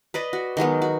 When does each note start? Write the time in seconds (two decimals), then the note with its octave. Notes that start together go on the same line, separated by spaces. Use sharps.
0.14 B4 D5 D#5
0.33 F#4
0.57 D#3 F#3 G#3 B3
0.82 F#4